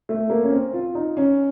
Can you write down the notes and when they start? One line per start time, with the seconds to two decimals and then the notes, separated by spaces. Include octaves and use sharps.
0.09 A3
0.30 A#3
0.43 C#4
0.51 C4
0.74 F4
0.95 D#4
1.17 C#4